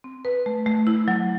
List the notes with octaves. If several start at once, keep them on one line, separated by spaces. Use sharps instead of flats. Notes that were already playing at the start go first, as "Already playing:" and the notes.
C4
B4
A3
A3
E4
F#3